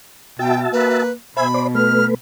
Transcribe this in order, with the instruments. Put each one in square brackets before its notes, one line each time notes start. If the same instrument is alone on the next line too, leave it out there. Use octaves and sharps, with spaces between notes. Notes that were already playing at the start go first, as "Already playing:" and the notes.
[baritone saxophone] B2 [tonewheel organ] F#4 E5 A5 [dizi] G5
[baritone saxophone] A#3 [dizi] B4
[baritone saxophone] B2 [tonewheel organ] C5 E5 G#5 [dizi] B5
[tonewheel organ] C5 D5
[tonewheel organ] A3 B4 [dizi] F6